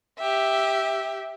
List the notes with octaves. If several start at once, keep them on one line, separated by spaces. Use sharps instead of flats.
G4 E5